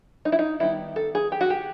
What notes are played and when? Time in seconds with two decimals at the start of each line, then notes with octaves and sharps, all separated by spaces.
0.25 D#4
0.32 E4
0.39 D#4
0.60 D#3 G3 B3 D#4 E4
0.96 A4
1.15 G#4
1.32 G4
1.41 F#4
1.50 G4